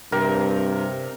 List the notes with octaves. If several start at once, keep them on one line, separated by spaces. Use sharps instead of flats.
G2 C3 A#4